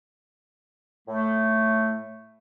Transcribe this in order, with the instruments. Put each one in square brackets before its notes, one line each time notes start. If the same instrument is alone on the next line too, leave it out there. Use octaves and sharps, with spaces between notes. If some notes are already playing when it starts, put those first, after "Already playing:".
[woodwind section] A2 A3